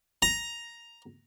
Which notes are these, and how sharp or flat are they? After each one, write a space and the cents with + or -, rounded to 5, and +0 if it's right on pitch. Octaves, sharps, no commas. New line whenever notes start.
A#5 +5